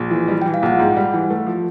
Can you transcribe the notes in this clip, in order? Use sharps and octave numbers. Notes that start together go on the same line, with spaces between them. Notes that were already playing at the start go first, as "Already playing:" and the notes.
Already playing: A#1
E3
G3
G5
E3
F5
A#1 F#5
G#2
G3
E3
A3
F3